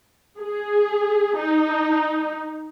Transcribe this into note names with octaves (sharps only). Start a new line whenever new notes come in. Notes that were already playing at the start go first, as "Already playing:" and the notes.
G#4
D#4